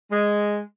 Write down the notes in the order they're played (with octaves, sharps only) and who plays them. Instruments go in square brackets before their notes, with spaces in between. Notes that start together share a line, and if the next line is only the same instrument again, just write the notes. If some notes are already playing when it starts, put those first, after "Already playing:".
[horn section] G#3